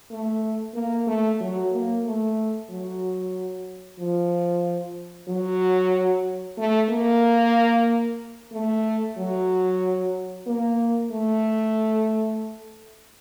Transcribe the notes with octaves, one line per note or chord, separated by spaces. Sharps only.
A3
A#3
A3
F#3
A#3
A3
F#3
F3
F#3
A3
A#3
A3
F#3
A#3
A3